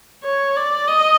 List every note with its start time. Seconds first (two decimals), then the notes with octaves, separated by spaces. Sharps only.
0.24 C#5
0.56 D5
0.87 D#5